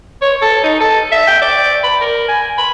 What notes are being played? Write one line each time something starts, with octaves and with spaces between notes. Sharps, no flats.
C#5
A4
D#4
A4
E5
G5
D5
B5
A#4
G#5
B5